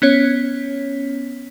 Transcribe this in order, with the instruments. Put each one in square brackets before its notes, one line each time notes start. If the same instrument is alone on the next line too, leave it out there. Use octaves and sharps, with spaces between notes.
[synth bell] B3 C#4 C#5 B6